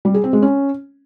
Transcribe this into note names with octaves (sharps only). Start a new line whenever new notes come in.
G3
G#4
C4
G#3
C#4